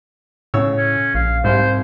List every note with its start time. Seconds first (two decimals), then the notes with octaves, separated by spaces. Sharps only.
0.54 A2 C#3 C#5 E6
0.77 C#4
1.14 A#1 F5
1.44 C2 G#2 C3 C5 F5